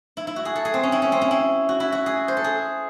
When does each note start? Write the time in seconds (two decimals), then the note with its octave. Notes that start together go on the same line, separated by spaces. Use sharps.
0.17 E4
0.27 E4
0.36 F#4
0.45 G#4
0.56 A4
0.65 G#4
0.74 C4
0.83 C#4
0.92 E4
1.02 C#4
1.12 C4
1.21 C#4
1.31 E4
1.69 F#4
1.80 E4
1.92 F#4
2.06 G#4
2.28 C5
2.37 A4
2.44 G#4